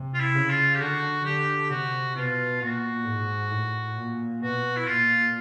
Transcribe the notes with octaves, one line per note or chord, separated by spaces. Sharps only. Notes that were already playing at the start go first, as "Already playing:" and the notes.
Already playing: C3
F4
E4
C#3
F4
G4
D3 F#4
D3 G4
C3 F#4
B2 F4
A#2 F#4
G#2
A2
A#2
B2 F#4
E4
A#2 F4